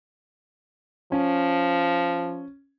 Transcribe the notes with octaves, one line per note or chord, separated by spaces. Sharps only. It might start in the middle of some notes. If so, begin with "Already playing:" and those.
F3 C#4